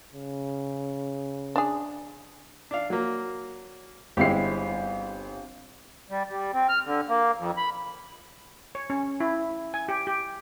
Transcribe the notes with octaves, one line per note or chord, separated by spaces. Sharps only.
C#3
D4 G#4
D4 F5
F#3 A#3
G1 G#3 C4 E4 G4 C7
G3
G3
C4
F6
D3
A#3
F2
B5
C#5
C#4
E4
G#5
G4
G4